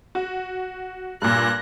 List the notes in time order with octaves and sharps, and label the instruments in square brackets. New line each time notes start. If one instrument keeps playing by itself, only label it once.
[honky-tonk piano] F#4
[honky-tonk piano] G2 A#2 [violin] F#6 A#6